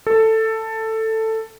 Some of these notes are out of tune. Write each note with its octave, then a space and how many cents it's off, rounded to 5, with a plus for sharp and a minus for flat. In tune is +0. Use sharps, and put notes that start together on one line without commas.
A4 +10